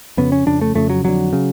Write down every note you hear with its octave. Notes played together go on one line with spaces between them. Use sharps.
F2 C#3 B3
C#4
F2 C#3 D4
A3
F2 C#3 A3
F#3
F2 D3 F#3
C#3